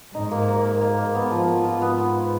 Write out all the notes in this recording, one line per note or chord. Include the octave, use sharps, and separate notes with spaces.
G#2 D#4
A#3
A#3
A#3
A#3
A#3
B3
F3
F3
G#2 F4
B3